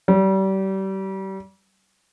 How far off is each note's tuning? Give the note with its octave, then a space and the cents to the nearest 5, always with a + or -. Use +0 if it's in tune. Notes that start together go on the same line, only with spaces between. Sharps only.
G3 -30